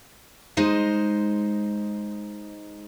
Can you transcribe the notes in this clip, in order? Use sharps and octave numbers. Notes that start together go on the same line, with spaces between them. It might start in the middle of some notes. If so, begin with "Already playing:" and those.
G#3 D#4 C5 D#5